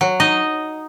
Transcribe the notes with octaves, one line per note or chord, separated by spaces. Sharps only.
F#3
D#4 D#5